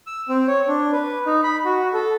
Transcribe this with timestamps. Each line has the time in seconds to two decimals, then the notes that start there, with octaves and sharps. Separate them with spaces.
0.07 E6
0.29 C4
0.47 C#5
0.68 D4
0.92 B4
1.26 D#4
1.43 B5
1.65 F#4
1.93 A4